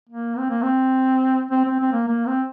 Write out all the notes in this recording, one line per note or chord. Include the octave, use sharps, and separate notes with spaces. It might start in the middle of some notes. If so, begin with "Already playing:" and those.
A#3
C4
A#3
C4
C4
C4
C4
A#3
A#3
C4